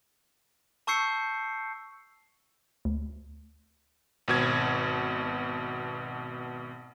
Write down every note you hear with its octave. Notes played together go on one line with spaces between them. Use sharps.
A5 C#6 E6 G6 C7 C#7
D2
G#1 B2 G#6